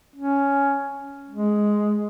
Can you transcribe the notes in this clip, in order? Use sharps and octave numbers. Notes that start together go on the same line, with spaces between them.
C#4
G#3